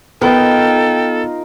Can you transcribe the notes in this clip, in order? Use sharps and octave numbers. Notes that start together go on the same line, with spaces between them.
B3 D#4 F4 A4 A#4 G5